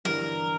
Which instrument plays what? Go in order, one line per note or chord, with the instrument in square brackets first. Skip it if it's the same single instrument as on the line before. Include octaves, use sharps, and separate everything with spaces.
[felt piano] G1 G2 E3 G3 [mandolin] A#4